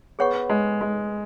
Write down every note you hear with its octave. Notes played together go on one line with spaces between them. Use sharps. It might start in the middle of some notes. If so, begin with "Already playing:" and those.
B3 G#4 C#5 F#5 C#6
G#3
G#3